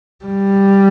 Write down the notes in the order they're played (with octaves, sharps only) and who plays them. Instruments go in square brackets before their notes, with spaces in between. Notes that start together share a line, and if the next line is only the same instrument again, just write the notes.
[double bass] G3